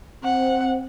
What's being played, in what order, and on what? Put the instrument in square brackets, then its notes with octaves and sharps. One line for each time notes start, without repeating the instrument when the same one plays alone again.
[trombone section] C4 [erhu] F#5